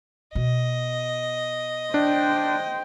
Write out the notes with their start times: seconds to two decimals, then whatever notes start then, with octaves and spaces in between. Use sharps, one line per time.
0.35 B2 D#5
1.94 D4 C5 G5